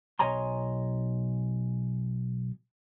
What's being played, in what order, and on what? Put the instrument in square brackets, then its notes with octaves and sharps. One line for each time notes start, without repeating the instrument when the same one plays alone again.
[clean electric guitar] B1 C#5 D#5 G#5 A#5 C6